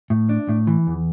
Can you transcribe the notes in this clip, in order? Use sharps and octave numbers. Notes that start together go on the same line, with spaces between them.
A2
D4
A2
E3
E2